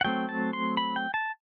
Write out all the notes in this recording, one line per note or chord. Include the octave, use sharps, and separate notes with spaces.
F#5
F#3 A3 C4 G5
A5
C6
B5
G5
A5